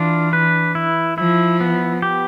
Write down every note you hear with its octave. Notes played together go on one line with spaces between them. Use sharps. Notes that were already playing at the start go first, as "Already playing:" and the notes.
Already playing: E3 D4 F4
B4
E4
F3 E4
B3
G4